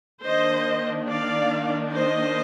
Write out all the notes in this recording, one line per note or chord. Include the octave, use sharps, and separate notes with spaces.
D#3 A#3 D4 C5 D#5
D5 F5
C5 D#5